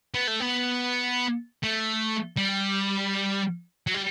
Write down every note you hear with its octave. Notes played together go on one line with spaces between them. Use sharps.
B3
A3
B3
A3
G3
F#3
G3